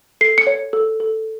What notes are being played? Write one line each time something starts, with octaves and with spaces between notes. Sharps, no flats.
A4 C7
C#7
C#5
A4
A4